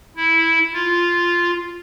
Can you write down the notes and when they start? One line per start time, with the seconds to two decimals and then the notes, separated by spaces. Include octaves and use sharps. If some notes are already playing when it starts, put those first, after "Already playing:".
0.17 E4
0.74 F4